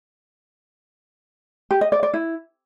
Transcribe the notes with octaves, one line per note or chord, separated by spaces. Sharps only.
G4
D#5
D5
D5
E4